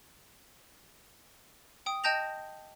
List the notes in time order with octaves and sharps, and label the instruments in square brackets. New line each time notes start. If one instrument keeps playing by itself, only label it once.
[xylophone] G5 D#6
D#5 G5 A5 G6 A#6 F7